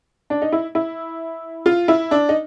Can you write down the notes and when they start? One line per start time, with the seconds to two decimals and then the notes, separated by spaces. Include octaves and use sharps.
0.30 D4
0.42 D#4
0.52 E4
0.75 E4
1.66 F4
1.88 E4
2.11 D4
2.29 D#4